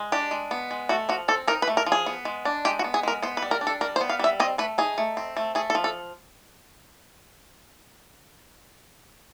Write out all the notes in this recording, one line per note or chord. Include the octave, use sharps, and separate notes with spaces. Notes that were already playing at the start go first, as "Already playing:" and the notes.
Already playing: G#3
D4 G4
G#3
B3
G#3
A3 F#4
F3 F#4
C4 A4
D#4 A#4
B4
A3
A#4
F3
G#4
B3
G#3
D4
G#3 G4
F#4
B3
G#4
G#3 A#4
B3 C5
B4
G3
A#4
D4
A4
G3 A#4
C5
B3
F5
G3 E5
C4 D#5
A3 B4
D#4 G#4
A3
C4
A3
A3 G#4
A4
F3
A4